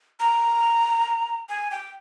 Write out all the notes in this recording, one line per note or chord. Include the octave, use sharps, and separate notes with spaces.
A#5
G#5
G5